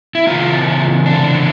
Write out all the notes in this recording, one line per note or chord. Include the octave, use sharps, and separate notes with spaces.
E4
C#3 E3 A#3 F4
D4